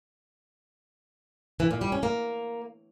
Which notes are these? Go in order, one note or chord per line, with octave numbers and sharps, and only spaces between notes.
E3
A#2
G3
C#4
A#3